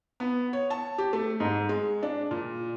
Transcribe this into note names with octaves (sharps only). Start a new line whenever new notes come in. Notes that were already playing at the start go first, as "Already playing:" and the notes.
B3
C#5
A5
G4
A3
G#2
G#3
D4
A#2